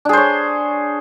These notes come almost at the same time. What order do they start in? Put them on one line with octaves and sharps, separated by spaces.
D4 G#4 C5 C#5